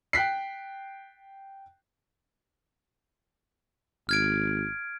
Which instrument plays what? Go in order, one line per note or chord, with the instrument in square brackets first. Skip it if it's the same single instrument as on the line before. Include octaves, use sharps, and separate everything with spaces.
[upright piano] G5 F#6 B6 C7
[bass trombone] G#1 [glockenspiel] F6 G#6 D7